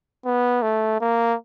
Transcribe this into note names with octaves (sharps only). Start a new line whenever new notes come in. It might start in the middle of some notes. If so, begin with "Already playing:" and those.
B3
A3
A#3